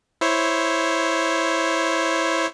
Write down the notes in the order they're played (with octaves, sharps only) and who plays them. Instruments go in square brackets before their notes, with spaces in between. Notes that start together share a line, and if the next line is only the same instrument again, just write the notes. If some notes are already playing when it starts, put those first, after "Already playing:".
[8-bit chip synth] E4 C5 C#5